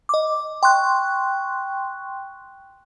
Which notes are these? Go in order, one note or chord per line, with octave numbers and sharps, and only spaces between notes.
D#5 D6
G5 C6 C#6 F#6